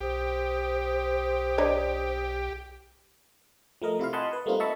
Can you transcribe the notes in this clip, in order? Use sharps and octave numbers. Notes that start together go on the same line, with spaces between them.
B1 G4 C5 D#6
D4 C#5 D#5
F3 A3 A#4 D#5
C3 E4 F4 F5
D#5 F#5 G#5 A5 B5 C6
B4
G3 A3 A#3 C4 D#4 F4
D#5 E5 A5 B5 C#6